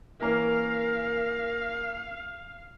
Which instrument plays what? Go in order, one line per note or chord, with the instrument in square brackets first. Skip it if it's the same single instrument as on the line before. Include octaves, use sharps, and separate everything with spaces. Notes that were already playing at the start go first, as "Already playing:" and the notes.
[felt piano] E3 A#3 C#4 [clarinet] A#4 [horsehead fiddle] F5